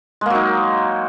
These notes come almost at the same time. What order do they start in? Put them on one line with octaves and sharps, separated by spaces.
G#3 A#3 F#3 D#4